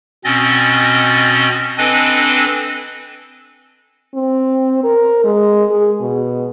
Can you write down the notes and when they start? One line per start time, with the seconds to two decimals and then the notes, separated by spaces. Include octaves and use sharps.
0.25 B2 C4 C#4 D#5 A6
1.78 C4 D4 A4 B4 D#5 G#5
4.14 C4
4.84 A#4
5.24 G#3
5.70 G#4
6.00 B2